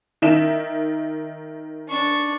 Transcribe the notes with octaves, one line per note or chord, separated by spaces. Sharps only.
D#3 E5 E7
D4 C#6